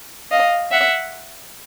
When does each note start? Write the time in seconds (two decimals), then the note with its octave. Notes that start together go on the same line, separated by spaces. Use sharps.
0.31 D#5 F5
0.71 E5 F#5